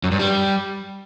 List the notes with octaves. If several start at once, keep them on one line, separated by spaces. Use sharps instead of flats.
F#2
G2
G3